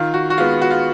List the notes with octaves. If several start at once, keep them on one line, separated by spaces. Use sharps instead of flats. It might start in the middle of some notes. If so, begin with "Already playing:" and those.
Already playing: D#3 F4
F#4
F#4
G#3 B3 F4
F#4
F4